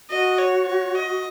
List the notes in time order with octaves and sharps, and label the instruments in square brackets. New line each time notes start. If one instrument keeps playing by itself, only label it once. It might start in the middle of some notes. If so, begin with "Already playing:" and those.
[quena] F#4 [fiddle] D#5
[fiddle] C#5
C#5
D#5